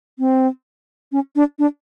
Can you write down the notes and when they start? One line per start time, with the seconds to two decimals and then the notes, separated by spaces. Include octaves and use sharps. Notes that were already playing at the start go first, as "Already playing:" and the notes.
0.19 C4
1.12 C#4
1.36 D4
1.59 D4